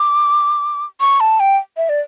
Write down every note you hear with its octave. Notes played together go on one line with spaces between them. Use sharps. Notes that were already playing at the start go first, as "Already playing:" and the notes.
Already playing: D6
C#6
A5
G5
E5
D5